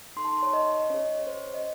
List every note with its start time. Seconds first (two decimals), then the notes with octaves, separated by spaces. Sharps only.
0.16 D#4 A4 C6
0.25 A5
0.32 C6
0.43 C#5
0.53 D#5
0.84 D#5
0.90 C#4 G#4 C#5
1.18 C#5
1.27 C5
1.54 D#5